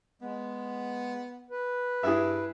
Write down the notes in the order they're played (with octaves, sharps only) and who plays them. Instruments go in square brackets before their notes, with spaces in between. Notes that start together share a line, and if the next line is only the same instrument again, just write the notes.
[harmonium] G#3 [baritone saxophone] B3
[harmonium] B4
[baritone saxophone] G2 [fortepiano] E4 G#4 E5